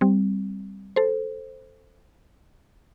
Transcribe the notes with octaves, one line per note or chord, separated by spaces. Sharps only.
G3 C4
A4 C5